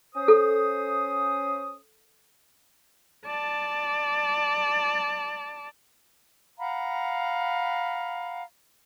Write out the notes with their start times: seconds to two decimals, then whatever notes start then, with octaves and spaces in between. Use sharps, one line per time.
0.15 C#4 C5 D#6
0.28 A4
3.27 D5 A5
6.58 F5 F#5 A#5 B5